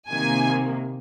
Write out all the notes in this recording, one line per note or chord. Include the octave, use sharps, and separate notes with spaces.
C3 D#3 A#3 G#5